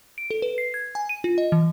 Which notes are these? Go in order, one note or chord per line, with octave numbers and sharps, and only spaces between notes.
D7
A4
B4
C7
G#6
G#5
D#7
F4
D#5
E3